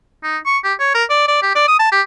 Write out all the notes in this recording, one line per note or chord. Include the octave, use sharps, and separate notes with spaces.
D#4
C#6
G4
C#5
A#4
D5
D5
G4
D5
D#6
A5
G4